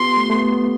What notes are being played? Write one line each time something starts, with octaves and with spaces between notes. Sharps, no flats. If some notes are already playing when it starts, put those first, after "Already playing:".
Already playing: B3 F4 G4 C6
A3
A3
B3
B3